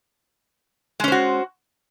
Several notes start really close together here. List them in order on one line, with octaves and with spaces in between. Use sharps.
G#3 C#4 C5 F#4